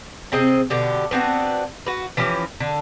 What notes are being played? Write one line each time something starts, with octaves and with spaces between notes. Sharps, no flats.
C3 C4 G#4 D#5
B2 D3 G4
B3 C4 D4 F#4
F#4 B4
E3 F3 C#4 G4
D3